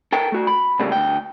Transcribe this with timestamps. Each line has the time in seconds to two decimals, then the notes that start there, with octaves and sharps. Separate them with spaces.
0.12 A4 A#4 G5
0.32 A3 F#4
0.47 B5
0.79 A2 C#3 G3 A3 A#3
0.92 D2 G5